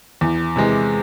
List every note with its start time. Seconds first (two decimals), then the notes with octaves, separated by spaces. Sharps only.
0.21 E2
0.56 C3 E3 G#3